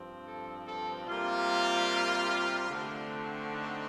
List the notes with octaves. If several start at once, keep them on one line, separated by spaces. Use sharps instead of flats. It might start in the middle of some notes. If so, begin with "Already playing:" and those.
Already playing: G2 F3 C4
A4
A4
C3 G3 A#3 F4
D3 A3 C4
D#4